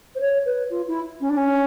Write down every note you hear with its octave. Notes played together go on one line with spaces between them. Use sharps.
C5
C#5
B4
F4
E4
C#4
D4
C#4